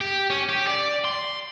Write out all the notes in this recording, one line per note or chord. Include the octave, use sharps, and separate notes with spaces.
G4
C#4
G4
D5
C6